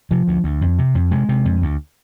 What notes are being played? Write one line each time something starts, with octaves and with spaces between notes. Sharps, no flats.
C3 F3
D2
D2
F2
C3
F2
C3 G#3
C3
F2
D2